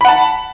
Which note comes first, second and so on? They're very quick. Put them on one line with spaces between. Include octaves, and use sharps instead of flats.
B5 F#5 A5